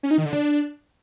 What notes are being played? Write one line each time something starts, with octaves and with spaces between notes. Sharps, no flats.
C#4
D#4
D#3
D3
D4